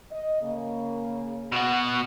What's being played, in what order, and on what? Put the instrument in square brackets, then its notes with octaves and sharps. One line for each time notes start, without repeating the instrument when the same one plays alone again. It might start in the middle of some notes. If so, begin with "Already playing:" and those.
[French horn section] D#5
C#3 A#3
[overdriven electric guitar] B2 F#4